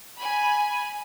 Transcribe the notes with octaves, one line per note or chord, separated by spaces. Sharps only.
G#5 B5